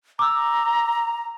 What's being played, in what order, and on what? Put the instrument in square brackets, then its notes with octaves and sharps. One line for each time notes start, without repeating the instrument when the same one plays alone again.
[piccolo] A#5 [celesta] D6 E6